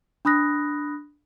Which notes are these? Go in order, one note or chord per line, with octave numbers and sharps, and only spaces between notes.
D4 B5 D#6 F#6 A#6